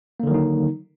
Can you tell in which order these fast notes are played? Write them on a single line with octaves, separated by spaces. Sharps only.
A#3 D3 D#3 F#3 D#4